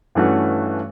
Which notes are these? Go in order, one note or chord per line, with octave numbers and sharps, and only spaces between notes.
G2 E3 A3 C#4 F#4